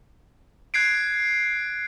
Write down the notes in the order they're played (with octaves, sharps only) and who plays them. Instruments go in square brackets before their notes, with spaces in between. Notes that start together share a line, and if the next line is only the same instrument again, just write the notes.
[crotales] F#6 G#6 C7 D7